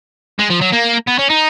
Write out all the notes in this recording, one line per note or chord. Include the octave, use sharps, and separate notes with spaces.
G#3
F3
F#3
A#3
B3
C#4
D#4